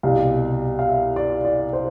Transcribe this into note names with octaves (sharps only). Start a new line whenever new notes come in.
C2 B2 F5
F5
E5
D5
D5
C5